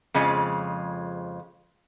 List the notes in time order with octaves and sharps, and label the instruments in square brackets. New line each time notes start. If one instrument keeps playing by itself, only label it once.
[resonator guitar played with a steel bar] F2 C#3 F3 G#3